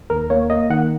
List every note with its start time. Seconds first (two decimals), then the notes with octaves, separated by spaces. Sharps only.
0.10 D#2 A#4
0.30 A#3 C#5
0.50 A#3 D#5
0.70 D#3 F#5